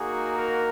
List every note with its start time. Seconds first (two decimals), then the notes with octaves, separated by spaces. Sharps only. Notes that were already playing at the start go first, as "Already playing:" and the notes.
Already playing: A#3 D#4 F#4 G#4
0.37 A#4